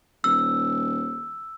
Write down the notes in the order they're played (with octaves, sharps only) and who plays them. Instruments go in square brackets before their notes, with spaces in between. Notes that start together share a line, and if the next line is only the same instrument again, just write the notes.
[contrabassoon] D#1 [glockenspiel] E6